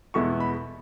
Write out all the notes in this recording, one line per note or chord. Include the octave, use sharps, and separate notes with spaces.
E2 B2 G#3 B3 E4 C#6
B5